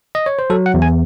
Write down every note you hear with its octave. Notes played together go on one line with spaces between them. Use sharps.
D#5
C#5
C5
F#3 A4
F#5
E2
G#5